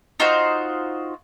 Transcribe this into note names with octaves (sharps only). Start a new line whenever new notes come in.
D#4 F4 F#4 C5